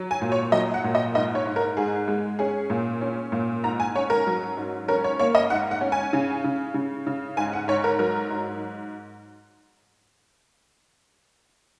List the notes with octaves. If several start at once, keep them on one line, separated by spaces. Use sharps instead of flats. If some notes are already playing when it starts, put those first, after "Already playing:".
Already playing: F#3
G#5
A#2
C#5
F#3 D#5
F#5
A#2
D#5
G#2 D#5
C#5
G#2
A#4
G#2 G#4
G#3
C#4 G#4
A#2
C#4
A#2
G#2 A#5
G#5
C#4 C#5
A#4
F#3
G#2
C#4 A#4
C#5
A#3 C#5
D#5
G#2 F#5
F#5
C#4
G#5
C#3
C#3
C#3
C#3
G#2 G#5
F#5
G#2 C#5
A#4
F#3 A#4
G#2